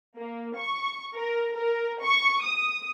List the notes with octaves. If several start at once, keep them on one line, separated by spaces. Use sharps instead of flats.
A#3
C#6
A#4
A#4
C#6
D#6